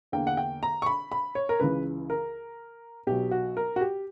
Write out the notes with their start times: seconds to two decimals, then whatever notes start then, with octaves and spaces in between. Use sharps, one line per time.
0.12 E2 D3 A#3 G5
0.27 F#5
0.37 G5
0.63 A#5
0.82 C#6
0.86 B5
1.12 B5
1.35 C#5
1.49 A#4
1.60 C#2 C#3 E3 B4
2.10 A#4
3.07 B1 B2 F#3 G4
3.31 F#4
3.57 A#4
3.76 F#4
3.81 G4